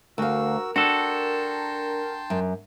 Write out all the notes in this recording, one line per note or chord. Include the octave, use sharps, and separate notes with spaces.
D2 F#4 A#4 F5 E6
D4 F#4 A4 G5 A5 C6
F#2